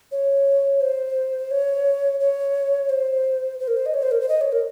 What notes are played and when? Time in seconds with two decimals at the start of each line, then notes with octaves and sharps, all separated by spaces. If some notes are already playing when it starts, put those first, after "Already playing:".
0.12 C#5
0.81 C5
1.51 C#5
2.20 C#5
2.89 C5
3.60 C5
3.68 A#4
3.77 C5
3.86 D#5
3.94 C#5
4.03 C5
4.11 A#4
4.21 C5
4.29 D#5
4.41 C#5
4.52 A#4